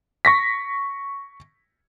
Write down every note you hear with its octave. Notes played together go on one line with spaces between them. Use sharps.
C#6 A#6 B6